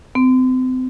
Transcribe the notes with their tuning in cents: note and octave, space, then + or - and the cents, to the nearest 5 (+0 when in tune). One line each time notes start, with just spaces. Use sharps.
C4 -35